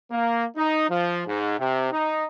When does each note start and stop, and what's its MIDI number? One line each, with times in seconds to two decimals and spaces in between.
0.11 0.46 58
0.56 0.88 63
0.89 1.22 53
1.27 1.57 44
1.59 1.89 48
1.92 2.25 63